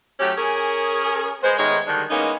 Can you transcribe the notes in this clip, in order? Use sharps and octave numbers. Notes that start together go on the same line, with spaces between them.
F#3 A3 C#4 G4
C#4 G#4 A#4
G#3 B3 C5
D#3 G#3 A3 B3 D#4 C#5
D3 D#3 G3 G#3 D4
E3 G#3 A#3 B3 C#4 D#4